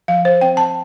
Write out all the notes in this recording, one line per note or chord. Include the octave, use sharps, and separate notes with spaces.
F3 F5
C5
C4 G5
A5